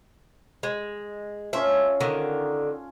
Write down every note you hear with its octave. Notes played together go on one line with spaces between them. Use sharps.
G#3
C#4 F4 E5 A5
D3 D#3